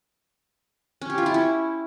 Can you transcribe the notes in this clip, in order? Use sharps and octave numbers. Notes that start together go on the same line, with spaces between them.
C#4
G4
F4
E4
C#4